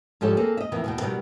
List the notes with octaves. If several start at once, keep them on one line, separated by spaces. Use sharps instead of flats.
G#2 F3 G3 G4 A4 C#5
A#3 C4 G#4 A4
D#5 E5
F2 D#3 E3 A#3
D#2 B2 G5
B2 D#3 F#3 G3